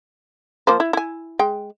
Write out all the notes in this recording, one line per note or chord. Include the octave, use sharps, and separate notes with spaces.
F3 A#3 C5
E4
E4 G#5
G#3 G5